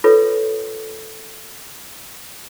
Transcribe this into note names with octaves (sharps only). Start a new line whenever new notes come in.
F4 A4 B4 C#5